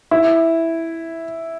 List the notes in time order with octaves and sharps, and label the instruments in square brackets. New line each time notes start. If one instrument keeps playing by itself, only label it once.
[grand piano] E4